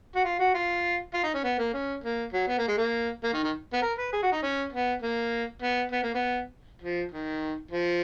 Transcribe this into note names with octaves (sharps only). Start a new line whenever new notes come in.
F#4
F4
F#4
F4
F4
D#4
C#4
B3
A#3
C#4
A#3
F#3
B3
A#3
G#3
A#3
A#3
D#3
D#3
B3
A#4
B4
G#4
F#4
D#4
C#4
B3
A#3
B3
B3
A#3
B3
F3
D#3
F3